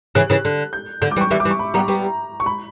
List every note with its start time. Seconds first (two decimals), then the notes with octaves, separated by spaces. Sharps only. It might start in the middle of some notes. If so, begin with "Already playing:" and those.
0.15 C#3 E3 F#6
0.30 C#3 E3
0.45 D3
0.73 G6
1.02 D3 G6
1.11 D6
1.16 E3 G3
1.21 C#6
1.31 E3 G3 E5
1.40 D6
1.45 E3 G3
1.51 C#6
1.59 B5
1.74 G3 B3 A#5
1.88 G3 B3
2.40 C#6
2.46 B5